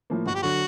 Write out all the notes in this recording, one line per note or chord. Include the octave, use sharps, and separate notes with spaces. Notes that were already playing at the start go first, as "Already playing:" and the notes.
A2 F3 A#3
G1 F#4
G4
D3 F#3 F#4